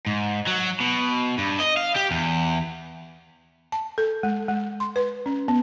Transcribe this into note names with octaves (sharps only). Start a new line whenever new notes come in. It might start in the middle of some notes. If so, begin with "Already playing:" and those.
G#2
F#3
B2
G2
D#5
F5
G4
E2
A5
A4
G#3
G#3
C6
B4
C#4
B3